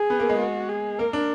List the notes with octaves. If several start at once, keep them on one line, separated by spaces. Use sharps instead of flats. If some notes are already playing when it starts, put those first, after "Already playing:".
Already playing: G#4
B3
A#3
G#3
F#4
G#4
A#3 A#4
D4